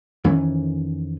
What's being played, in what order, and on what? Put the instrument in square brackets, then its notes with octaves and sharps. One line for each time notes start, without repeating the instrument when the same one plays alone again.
[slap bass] F2 D#3 E3 C#4